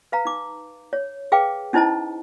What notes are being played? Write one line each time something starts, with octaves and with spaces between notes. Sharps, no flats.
B4 F5 A#5
D#4 D6
C#5
G#4 B4 F5 G5 D6
C#4 D#4 E4 C5 D#5 A5